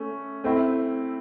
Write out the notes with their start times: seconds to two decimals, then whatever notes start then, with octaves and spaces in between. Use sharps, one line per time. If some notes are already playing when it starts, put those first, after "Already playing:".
Already playing: A3 C#4
0.44 A3 C4 E4